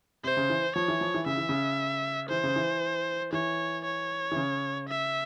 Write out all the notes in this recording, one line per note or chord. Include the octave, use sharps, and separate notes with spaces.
C3 C5
C#3
E3
F3 C#5
E3
F3
E3
C#3 E5
E3
C#3
E3 C5
C#3
E3
E3 C#5
C#5
E3
C#3
E5